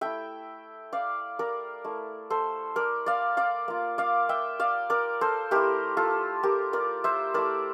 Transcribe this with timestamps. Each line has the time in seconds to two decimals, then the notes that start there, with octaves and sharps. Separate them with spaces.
0.01 A3 E4 E5 G5
0.93 D5 F5
1.39 A#4 D5
1.84 A3 E4
2.30 A4 C5
2.76 A#4 D5
3.06 D5 F5
3.37 D5 F5
3.68 A#3 F4
3.98 D5 F5
4.29 E5 G5
4.60 D5 F5
4.90 A#4 D5
5.21 A4 C5
5.51 A3 E4 G4 A#4
5.97 F4 A4
6.43 G4 A#4
6.73 A#4 D5
7.04 C5 E5
7.34 A3 E4 A#4 D5